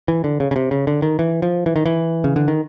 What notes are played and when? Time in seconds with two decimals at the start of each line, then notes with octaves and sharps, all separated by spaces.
0.08 E3
0.24 D3
0.40 C#3
0.51 C#3
0.56 C3
0.71 C#3
0.87 D3
1.02 D#3
1.19 E3
1.42 F3
1.66 E3
1.76 D#3
1.86 E3
2.24 C#3
2.36 D3
2.48 D#3